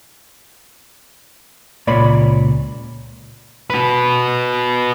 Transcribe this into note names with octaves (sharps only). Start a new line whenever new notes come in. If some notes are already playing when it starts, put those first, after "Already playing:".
C#2 A#2 C#5 D5 B5
F#4 B4